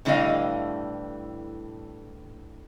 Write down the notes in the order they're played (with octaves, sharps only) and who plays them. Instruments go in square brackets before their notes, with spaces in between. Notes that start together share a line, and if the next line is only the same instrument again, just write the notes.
[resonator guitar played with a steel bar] A2 D3 E3 G3 D#5 F5